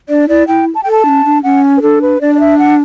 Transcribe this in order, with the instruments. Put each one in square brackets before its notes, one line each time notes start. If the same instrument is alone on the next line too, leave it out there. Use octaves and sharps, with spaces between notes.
[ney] D4 [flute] D5
[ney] E4 [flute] D5
[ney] E4 [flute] G5
[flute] A5
[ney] A4 [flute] G5
[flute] A5
[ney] D4
C#4
D4
[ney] C#4 [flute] F#5
[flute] B4
[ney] D4 [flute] A4
[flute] B4
[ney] D4 [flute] D5
[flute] D5
E5
F#5